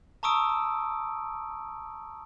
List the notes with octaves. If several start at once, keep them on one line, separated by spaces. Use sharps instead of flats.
A5 A#5 C#6 D#6 E6 D7